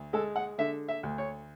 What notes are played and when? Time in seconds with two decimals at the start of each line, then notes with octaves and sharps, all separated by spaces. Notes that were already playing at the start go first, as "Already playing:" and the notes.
Already playing: D2
0.13 G#3 A4
0.36 F#5
0.58 D3 E5
0.88 E5
1.03 D2
1.18 C#5